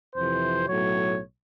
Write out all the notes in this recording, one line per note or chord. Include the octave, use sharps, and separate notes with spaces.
F2 C3 E3 C5
B1 A2 F#3 C#5